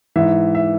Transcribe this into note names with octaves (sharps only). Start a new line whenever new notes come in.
G#2 E3 E5
E5